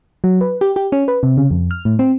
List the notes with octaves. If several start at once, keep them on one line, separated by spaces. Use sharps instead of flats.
F#3
B4
G4
G4
C#4
B4
C3
C#3
F2
F6
A2
C4